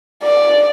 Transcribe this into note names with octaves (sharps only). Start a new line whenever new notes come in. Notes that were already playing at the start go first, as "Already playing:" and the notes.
D5